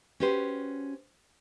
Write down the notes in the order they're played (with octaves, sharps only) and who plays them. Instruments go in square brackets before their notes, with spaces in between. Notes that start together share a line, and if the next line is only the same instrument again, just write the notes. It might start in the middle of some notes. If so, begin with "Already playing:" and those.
[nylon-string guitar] C#4 F#4 G4 B4 C5